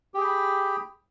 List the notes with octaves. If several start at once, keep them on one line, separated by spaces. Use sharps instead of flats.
G4 G#4 G5 B5